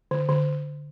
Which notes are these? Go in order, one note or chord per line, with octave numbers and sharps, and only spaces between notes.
D3
D3